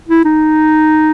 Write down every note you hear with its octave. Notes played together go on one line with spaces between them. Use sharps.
E4
D#4